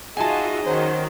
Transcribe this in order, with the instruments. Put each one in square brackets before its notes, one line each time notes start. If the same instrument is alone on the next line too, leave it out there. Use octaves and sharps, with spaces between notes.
[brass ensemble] D#4 G#4 D#5 [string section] F4 F#4 E5 [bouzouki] G#5 A5
[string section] D#3 F#3 C#4 [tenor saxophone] C5